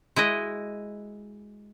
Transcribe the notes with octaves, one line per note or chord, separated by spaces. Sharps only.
G#3 E4 F#4 D#5